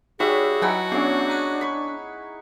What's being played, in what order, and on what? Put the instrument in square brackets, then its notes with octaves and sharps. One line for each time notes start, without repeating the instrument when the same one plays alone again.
[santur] G3 C#5 E5 [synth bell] D#4 [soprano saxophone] F#4 [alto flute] G#4
[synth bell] F#3 G#5 A5 [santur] D#4 E4 F#5
[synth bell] B3 C#4 [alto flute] D4 [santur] G#4 C#5
[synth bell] F#5 A#5 F#6
[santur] B5 C#6